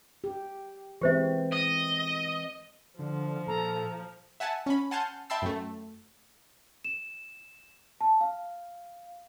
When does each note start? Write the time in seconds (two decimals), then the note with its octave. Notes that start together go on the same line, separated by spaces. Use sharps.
0.24 G4
1.01 E3 G#3 C4 G4 C5 E5
1.52 D#5
2.99 D3 F3
3.47 A#2 A4 A#5
4.40 E5 F#5 G#5 A5
4.66 C#4 B5
4.91 F#5 G#5 A5 C6 F6 G6
5.30 E5 G5 A5 B5 C6 E6
5.42 F#2 A3
6.84 E7
8.01 A5
8.21 F5